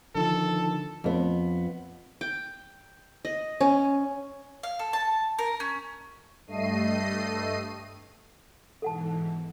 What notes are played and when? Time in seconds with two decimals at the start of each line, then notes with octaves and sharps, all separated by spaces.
0.15 D3 D#3 F3 A4
1.04 F2 B3
2.21 G5
3.25 D#5
3.61 C#4
4.63 F5
4.79 A4
4.93 A5
5.39 A#4
5.60 C#4
6.47 G2 A3 D#5 C7 D#7
8.82 G#2 B2 E3 A4 F#5 A5